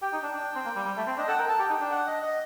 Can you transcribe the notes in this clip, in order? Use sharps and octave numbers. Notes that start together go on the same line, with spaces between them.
G4 G5
D#4
D4
D4
D4
C4
A#3
G3
G3
A3
C4
D4 D#5
A4 F#5
A#4 G5
A4 A5
G4 G5
D#4
G5
D4
F#5
D#5
D#5